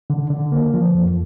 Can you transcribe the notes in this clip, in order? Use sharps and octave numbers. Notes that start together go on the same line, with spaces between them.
D3
D3
A#3
F3
F2